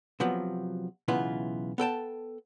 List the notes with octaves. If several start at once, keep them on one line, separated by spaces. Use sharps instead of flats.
C3 F3 F#3 B3
B1 C#3 E3 B3 E4 F4
B3 A4 G5 A5